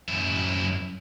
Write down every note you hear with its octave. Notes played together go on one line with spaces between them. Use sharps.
F#2 E4